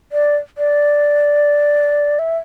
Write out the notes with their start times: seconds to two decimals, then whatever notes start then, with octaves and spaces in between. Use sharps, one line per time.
0.12 D5
0.58 D5
2.19 E5